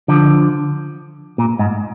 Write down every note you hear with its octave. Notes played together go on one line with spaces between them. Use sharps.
D3 F3
A#2
G#2